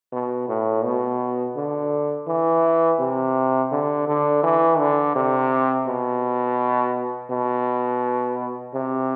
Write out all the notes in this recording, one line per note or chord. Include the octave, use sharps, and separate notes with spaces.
B2
A2
B2
D3
E3
C3
D3
D3
E3
D3
C3
B2
B2
C3